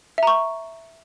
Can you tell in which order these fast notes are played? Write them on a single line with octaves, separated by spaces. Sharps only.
E5 A#5 C#6